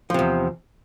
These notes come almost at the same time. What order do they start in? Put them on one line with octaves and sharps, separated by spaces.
F3 C3 E2